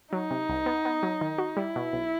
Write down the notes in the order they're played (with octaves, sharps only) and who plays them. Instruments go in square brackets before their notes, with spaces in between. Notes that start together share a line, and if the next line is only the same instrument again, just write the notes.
[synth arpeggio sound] F#3 [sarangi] D#4
[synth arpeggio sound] C3
C2
B3
B3
F#3
D#3
F#4
[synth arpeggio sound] G3 [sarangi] E4
[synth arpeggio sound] B2
B1